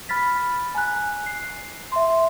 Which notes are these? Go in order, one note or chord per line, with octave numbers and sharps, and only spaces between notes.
B5 F6 A6 B6
G#5 A#5 F#6
C7
E5 C6